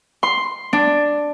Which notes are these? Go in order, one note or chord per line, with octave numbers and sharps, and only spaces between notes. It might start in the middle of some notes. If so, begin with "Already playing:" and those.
C6
D4